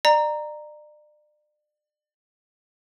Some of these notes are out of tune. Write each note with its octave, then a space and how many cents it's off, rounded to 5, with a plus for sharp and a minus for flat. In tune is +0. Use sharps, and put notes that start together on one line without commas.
D5 +35 A#5 +0